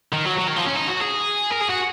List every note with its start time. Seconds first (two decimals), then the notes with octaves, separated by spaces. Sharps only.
0.13 D#3
0.25 F#3
0.37 F#3
0.47 D#3
0.56 F3
0.65 C#4
0.76 D#4
0.88 F#4
1.00 G#4
1.51 A#4
1.61 G#4
1.70 F#4